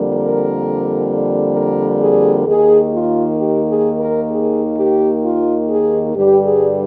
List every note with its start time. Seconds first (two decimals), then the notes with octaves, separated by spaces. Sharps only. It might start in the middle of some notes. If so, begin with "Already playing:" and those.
Already playing: F2 D3 G3 A#3
0.15 A#4
1.54 A#4
2.00 G#4
2.46 D#2 D#3 A#3 G#4
2.92 F4
3.37 G4
3.68 G#4
3.99 A#4
4.30 G#4
4.77 G4
5.23 F4
5.69 G#4
6.14 G2 D3 G3 G4
6.45 G#4